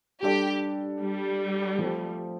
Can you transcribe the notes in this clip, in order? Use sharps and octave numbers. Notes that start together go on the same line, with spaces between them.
G3 D4 G4 A4 D5
G3
F3 A3 C4